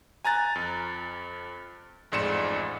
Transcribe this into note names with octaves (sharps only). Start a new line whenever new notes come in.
G#5 A#5 F#6 A6
F2
A1 F2 G#2 D5 C#7 E7